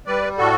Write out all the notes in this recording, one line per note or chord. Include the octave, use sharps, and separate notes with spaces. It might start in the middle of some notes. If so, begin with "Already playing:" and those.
G3 B4 D5
A2 F#4 A4